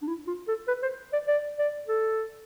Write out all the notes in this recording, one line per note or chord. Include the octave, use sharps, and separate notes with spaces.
D4
E4
F4
A4
B4
C5
D5
D5
D5
A4